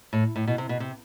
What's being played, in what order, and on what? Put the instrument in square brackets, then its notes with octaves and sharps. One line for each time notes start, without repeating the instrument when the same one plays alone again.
[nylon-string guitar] A2
A2
B2
C3
B2
C3